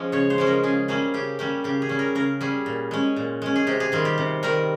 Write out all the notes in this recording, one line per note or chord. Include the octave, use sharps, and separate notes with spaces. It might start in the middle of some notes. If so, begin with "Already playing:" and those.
Already playing: F3 G#3 C#4
C#3 C#5
C5
F3 G#3 C#4
A#4
C#3 G#4
G3 A#3 C#4 G#4
C#3 G4
G3 A#3 C#4 G4
C#3 G4
G#4
G3 C#4
A#4
C#3 A#4
G3 C#4 G#4
A#2
G#3 C#4
A#2
G#3 C#4
G#4
C3 G4
G#4
D#3 G3 F4
G4
C3
D#3 G3 A#4